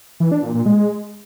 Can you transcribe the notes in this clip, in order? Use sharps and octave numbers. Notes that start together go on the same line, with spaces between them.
E3
D4
A#2
A#2
G#3